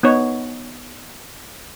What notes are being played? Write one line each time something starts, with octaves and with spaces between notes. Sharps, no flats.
B3 D#4 C#5